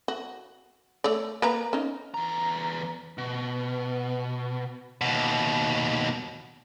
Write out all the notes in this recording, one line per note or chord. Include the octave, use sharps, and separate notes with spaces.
F#4
A3 C#5 D5
A#3 B4 A#5
C#4 D#4
E2 A#5
B2
D#2 B2